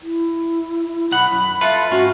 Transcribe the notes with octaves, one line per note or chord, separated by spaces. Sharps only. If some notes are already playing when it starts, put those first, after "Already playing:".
E4
B1 D#3 F#5 B5
F#2
F4 A4 B4 E5
G#2 C#4 F4 F#4